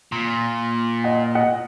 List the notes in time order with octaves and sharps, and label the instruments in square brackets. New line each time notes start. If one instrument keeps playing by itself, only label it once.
[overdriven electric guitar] A#2
[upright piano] D#5 F#5
D#5 F#5